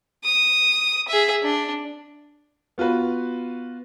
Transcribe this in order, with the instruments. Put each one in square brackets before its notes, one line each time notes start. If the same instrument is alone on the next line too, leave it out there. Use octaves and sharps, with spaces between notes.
[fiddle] D#6
G#4 E5
D4
[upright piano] B3 F4 F#4 B4